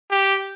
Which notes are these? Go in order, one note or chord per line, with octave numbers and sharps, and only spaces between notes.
G4